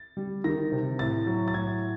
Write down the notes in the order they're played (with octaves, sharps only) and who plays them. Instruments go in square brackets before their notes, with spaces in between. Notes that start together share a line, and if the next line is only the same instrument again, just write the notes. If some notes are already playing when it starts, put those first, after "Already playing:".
Already playing: [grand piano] A6
G3
D#3 A#6
C3
A2 A6
F#3
A6
A2 G#6